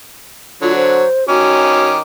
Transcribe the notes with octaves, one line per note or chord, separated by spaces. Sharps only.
D3 F#3 F4
C5
D#3 C#4 F#4 D6